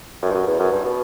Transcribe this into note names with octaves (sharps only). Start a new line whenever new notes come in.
F#2
G2
F#2
E2
F#2
G2
B2